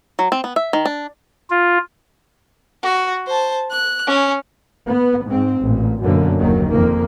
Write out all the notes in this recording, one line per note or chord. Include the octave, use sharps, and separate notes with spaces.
F#3
C4
B3
E5
D#3
D4
F4
F#4
C5 A5
F#6
C#4
B3
G#2 C4
A1 A#2
F#2 B2 D3 A#3
F#1 D#2 D#3 F#3
F2 A#3